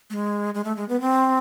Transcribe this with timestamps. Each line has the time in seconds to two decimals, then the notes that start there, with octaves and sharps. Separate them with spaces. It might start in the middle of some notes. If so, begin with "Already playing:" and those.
0.10 A3
0.13 G#3
0.54 G#3
0.64 A3
0.76 G#3
0.89 B3
1.01 C4